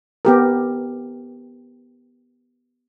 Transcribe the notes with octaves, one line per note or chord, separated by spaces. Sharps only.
B3 G4 A#4